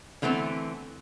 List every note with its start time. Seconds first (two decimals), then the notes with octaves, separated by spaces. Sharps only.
0.22 D3 E3 A3 B3 C4